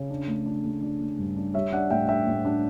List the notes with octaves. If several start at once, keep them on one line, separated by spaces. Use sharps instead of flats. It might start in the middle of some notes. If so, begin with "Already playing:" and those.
Already playing: C#3
D4
A3
D4
A3
D4
A3
G2
D4
G3 C#5 E5
D4 D5 F#5
A2 E5 G5
D4 E5 G5
A2
D4